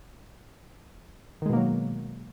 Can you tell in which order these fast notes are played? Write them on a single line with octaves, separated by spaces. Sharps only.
D#3 G#3 B2 A#3 F#3